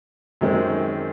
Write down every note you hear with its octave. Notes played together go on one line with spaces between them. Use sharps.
F#2 D#3 G#3 C4